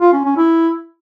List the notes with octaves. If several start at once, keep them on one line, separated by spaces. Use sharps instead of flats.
F4
C#4
C#4
E4